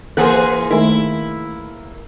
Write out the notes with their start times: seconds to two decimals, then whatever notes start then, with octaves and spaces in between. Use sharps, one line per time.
0.17 E3 A#3 G#4 C5 F#5 F#6
0.70 D#3 A3 E4